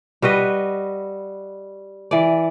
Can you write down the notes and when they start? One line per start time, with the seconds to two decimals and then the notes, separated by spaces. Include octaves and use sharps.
0.22 G3 F#4 B4 D#5
2.11 E3 D5